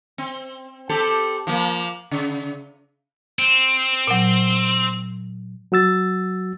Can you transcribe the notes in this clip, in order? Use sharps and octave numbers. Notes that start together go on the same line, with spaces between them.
C4
C4 G4 A4
F3 A#3
C#3
C4
A#2 F#3
F#3 F#4 E6 A6